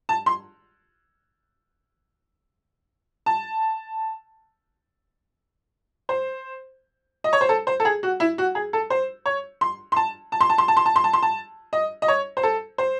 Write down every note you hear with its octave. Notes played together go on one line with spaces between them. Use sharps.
A5
C6
A5
C5
D#5
C#5
C5
A4
C5
A4
G#4
F#4
E4
F#4
G#4
A4
C5
C#5
C6
C6
A5
A5
C6
A5
C6
A5
C6
A5
C6
A5
C6
A5
D#5
D#5
C#5
C5
A4
C5